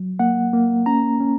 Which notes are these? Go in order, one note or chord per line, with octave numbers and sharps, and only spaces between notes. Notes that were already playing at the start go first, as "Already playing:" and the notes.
Already playing: F#3
A#3 F#5
A#3
C#4 A#5
C#4